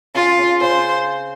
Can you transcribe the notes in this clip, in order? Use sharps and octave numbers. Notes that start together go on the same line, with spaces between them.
C#3 F4
C#3
C#3 C5